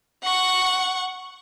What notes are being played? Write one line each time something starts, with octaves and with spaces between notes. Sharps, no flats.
F#5 C#6